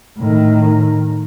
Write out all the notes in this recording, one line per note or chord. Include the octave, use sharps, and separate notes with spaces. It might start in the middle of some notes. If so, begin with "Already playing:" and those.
A2 D#3